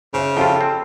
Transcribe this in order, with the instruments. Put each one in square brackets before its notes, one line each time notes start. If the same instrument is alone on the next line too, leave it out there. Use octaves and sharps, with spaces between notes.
[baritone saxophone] C#3 [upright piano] C5 E5
[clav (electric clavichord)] F2 F4 [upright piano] G4 A4 G5
[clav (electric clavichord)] C4